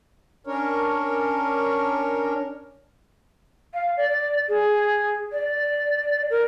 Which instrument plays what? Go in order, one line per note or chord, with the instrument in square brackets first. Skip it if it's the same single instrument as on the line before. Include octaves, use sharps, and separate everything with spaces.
[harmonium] C#4 D4 A#4 C#5
[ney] F5
D5
G#4
D5
A#4